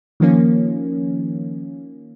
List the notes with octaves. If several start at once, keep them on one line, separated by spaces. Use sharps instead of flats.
D#3 F3 A#3 C#4